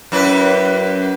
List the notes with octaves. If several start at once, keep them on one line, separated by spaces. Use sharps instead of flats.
F#2 E4 B4